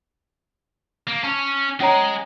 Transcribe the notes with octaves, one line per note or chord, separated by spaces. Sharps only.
A#3
C#4 A5 D6
G#3 C#4 G#4 C#5 A#5